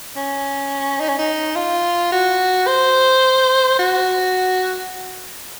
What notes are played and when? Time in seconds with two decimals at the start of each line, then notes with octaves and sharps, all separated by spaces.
0.16 C#4
1.00 D#4
1.09 C#4
1.18 D#4
1.55 F4
2.12 F#4
2.67 C5
3.79 F#4